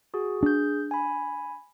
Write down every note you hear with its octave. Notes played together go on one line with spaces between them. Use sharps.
F#4 G#4
D4 G#4 G6
G#5 B5